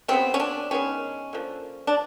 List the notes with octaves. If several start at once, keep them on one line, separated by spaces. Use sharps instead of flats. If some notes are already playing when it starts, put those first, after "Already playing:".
C#3 F#3 B3 C4
C#4
D4
D#3 G#3 B3 C#4
D3 F3 A#3
D4